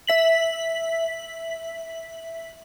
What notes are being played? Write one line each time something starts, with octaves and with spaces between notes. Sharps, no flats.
E5 B6 F#7